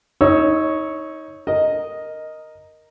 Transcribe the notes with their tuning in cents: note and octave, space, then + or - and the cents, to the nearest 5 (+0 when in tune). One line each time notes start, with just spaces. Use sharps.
D#4 +25 C#5 +0 E6 -5
A#4 +0 D#5 +0